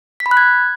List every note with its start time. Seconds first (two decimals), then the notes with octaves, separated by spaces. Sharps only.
0.20 B6
0.26 B5
0.31 F#6
0.37 G#6